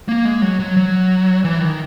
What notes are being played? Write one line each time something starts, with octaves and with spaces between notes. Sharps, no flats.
A#3
G#3
F#3
F#3
F#3
E3
D#3